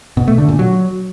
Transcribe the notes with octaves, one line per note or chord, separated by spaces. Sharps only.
B2
A3
D3
A#2
F#3